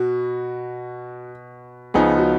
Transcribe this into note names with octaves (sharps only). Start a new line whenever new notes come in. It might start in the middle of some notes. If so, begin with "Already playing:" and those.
Already playing: B2 F#4
C#2 C#3 F3 B3 D#4 G#4
F#4